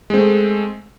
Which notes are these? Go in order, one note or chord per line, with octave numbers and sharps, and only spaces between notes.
G#3 A3 C4